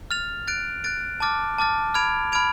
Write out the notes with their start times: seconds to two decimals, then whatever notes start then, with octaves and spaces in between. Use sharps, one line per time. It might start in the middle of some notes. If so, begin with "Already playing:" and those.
0.11 F6 A6 F7
0.47 F#6 A6 D7
0.84 F#6 A6 D7
1.20 A5 D6 F6 A6
1.58 A5 D6 F6 A6
1.94 B5 F6 G#6 D7 F7
2.32 B5 F6 G#6 D7 F7